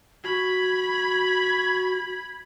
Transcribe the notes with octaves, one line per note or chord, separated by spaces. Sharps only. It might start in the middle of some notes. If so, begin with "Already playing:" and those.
F#4 B5 G#6